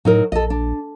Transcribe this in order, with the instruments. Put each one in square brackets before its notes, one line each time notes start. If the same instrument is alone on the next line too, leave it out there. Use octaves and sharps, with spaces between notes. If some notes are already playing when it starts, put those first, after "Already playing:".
[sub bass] A2 [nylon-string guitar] F#3 D#4 A#4
[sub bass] A#1 [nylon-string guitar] A4 D#5
[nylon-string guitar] D4